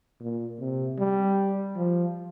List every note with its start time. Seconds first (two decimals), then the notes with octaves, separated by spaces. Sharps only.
0.20 A#2
0.59 C3
0.99 G3
1.77 F3